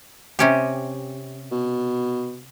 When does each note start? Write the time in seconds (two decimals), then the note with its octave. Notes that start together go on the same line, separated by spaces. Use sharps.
0.39 C3 C#4 G4
1.51 B2